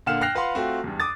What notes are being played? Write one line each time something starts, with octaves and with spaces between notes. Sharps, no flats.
A#2 D3 F5 F#5 F6 E7
G5 F6 F#6 A#6 C7 F7
F4 B4 F5 F#5 C6
A3 C4 F4 F#4
E2 G2
D6 D#6 A6